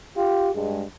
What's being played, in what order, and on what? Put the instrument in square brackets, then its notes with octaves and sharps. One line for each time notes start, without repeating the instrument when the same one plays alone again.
[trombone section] F4 G4
G2 G#3